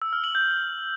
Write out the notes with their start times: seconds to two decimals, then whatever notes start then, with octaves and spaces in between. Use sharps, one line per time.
0.02 E6
0.13 F6
0.24 F#7
0.35 G6